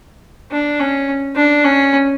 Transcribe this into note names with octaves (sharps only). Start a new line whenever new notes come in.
D4
C#4
D4
C#4